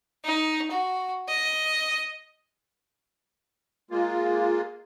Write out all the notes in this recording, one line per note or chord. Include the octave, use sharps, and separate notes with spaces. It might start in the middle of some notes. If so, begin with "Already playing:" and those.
D#4
F#4
D#5
G#3 A#3 F4